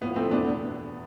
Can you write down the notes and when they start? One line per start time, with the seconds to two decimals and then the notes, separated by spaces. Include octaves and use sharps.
0.01 A2 B3
0.05 F3
0.16 A3 C4
0.30 E2 B2 B3 D4